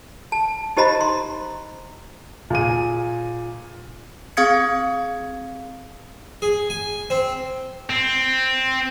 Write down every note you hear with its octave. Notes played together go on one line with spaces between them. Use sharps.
A5
D#4 G4 C5 D#5 A#5 B5
C6
A#2 G#4 D#7
C4 G#4 F5 D#6 G#6 C#7
G#4
G#5
C4
C4